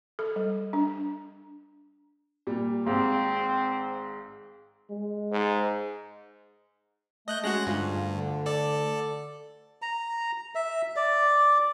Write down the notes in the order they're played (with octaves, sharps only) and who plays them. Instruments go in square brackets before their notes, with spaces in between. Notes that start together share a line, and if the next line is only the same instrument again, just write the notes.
[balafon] A4
G3
D4
[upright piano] A#2 G3
[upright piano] G#1 G#2 F5 [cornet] C4
[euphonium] G#3
[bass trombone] G#2
[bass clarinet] A3 [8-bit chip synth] D#5 F#6 G6
[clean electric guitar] G#3 [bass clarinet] C#4 [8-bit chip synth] F#4 F#6 A#6
[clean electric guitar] D2 [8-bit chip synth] G2 [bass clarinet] F4
[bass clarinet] D3
[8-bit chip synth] A4 D5
[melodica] A#5
E5
D5